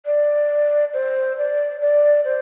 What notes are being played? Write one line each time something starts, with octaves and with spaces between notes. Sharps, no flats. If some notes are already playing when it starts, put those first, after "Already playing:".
D5
C5
D5
D5
C5